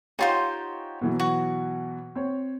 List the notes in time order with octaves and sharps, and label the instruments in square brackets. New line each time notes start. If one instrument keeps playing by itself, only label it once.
[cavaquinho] D#4 F4 C5 [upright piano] G4 C#5 F#5
[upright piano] B2 E3 F#3
[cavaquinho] F#4
[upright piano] C4 C#5